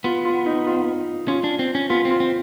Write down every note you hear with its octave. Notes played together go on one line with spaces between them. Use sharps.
B3 F4
F4
D#4
F4
C#4 F4
D4
C4
C#4
B3 F4
C4
F4
C4